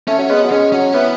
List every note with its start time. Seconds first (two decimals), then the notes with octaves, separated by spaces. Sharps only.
0.08 A3 C#4
0.18 F#3
0.29 G#3 B3
0.44 F#3
0.51 G#3 C#4
0.72 F#3 C#4
0.94 E3 B3